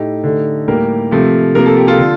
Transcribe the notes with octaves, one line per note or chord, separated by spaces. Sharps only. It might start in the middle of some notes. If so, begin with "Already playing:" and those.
Already playing: A2 A3 D#4 G4
D3 A3
A2 G3 A#3 G4 A#4
C3 F3 A3
C3 F3 A#3 A#4
A4
G4
F4 A4
D3